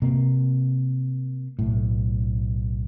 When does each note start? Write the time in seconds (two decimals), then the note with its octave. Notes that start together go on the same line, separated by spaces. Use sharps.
0.02 C3 A#3
1.59 B1 A2